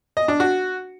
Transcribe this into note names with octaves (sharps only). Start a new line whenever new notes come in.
D#5
D4
F#4